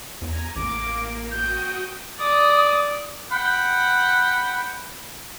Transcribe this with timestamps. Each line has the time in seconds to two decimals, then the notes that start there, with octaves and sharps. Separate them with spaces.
0.22 E2 G#5 A#5
0.56 A1 A#3 D6
1.31 F#4 G5 D#6 G6
2.20 D5 D#6
3.32 F#5 G5 B5